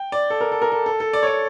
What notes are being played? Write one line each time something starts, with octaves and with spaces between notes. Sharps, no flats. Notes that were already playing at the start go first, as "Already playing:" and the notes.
Already playing: G5
D5
A4
A#4
A4
A#4
A4
A4
A4
D5
C#5
D5